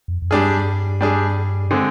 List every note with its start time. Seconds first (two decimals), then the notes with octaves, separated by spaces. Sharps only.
0.08 F2
0.22 F2
0.31 G2 G3 D4 G#4
1.01 G3 D4 G#4
1.71 D3 G#3 C4